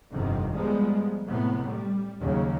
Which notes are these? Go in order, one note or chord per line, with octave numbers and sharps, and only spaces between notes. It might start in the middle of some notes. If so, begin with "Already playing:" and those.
G1 F2 C3 D#3
G#2 F3 G3 G#3 B3
A2 C3 B3
G3
D#2 C#3 F#3